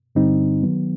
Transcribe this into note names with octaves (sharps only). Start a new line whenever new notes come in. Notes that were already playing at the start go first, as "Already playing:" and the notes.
G2 D3 G3 C4 D#4
D#3 F#3 B3